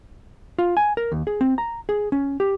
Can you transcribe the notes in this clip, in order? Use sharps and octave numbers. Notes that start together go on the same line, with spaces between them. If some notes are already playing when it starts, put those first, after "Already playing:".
F4
G#5
A#4
D#2
G#4
C4
A#5
G#4
C#4
G4